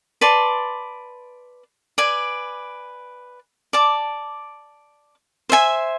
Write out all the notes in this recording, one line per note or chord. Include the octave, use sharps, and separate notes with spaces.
B4 D5 A5 C6
B4 D5 G#5
D5 A5 D6
C5 E5 G#5